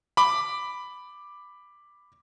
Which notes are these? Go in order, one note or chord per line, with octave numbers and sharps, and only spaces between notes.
B5 D6